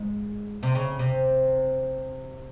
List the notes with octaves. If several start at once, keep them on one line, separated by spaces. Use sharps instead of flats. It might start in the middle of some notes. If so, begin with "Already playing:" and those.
Already playing: G#2 G#3
C3
C#3
C3